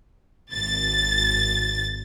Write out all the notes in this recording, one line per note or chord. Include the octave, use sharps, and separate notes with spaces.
G#1 A6